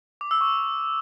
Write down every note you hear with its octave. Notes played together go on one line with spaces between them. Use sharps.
D6
E6
C#6